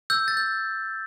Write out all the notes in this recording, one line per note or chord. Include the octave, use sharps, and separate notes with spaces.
E6 G6
A6
G6